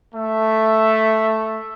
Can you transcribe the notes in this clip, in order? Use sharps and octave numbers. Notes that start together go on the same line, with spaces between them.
A3 E5